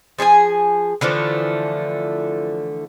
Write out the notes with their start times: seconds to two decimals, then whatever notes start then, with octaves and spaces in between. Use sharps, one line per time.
0.18 F3 G#4 C5 G#5
1.01 D3 E3 F3 A3